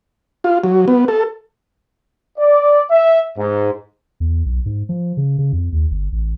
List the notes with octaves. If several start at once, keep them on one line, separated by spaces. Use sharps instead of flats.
F4
F#3
B3
A4
D5
E5
G#2
E2
B1
G#2
F3
C#3
C#3
F2
D#2
G1
A1